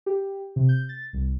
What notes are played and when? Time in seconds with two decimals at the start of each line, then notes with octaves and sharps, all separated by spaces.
0.06 G4
0.56 C3
0.69 G6
0.89 A6
1.13 C2